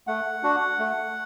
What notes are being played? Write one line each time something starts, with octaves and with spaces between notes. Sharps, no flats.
A3 F#5
D4 F#4
A3